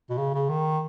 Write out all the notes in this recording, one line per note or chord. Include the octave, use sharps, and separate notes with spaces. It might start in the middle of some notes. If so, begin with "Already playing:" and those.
B2
C#3
C#3
D#3